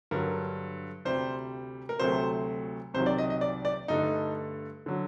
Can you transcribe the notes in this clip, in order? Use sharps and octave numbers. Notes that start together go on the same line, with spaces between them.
G2 D3 F#3 A#4
D2 C3 G3 C5
A#4
D2 C3 F#3 A3 C5
C2 C3 D#3 F#3 C5
D5
D#5
D#5
D5
D5
G2 D3 A3 D#4
D3 F#3